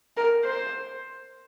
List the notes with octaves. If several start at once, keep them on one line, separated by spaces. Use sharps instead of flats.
A#4
C5